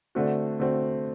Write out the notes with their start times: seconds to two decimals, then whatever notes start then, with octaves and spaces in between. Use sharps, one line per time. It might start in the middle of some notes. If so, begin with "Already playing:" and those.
0.15 D3 A3 C4 F#4
0.59 D3 A3 C4 F#4